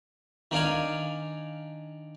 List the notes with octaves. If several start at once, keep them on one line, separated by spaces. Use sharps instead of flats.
D#3 D4 F5 G#5